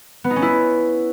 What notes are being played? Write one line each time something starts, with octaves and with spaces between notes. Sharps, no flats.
B3
D#4
C#4
E4